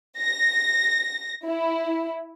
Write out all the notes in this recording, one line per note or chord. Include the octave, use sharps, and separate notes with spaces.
A#6
E4